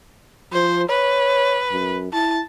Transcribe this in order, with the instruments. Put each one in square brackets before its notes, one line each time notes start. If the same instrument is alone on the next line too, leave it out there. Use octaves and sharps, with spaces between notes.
[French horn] F3 [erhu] C5
[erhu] B4 [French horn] C#5
[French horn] F#2
[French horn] E4 [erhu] A5